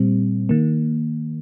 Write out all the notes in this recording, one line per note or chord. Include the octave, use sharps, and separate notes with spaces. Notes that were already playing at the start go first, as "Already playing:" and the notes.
Already playing: A#2 G3 C4
D#3 A#3